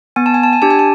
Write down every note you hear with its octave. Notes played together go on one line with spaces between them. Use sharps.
B3 G#5
A5
G#5
A5
G#5
D4 G4 A5
G#5
A5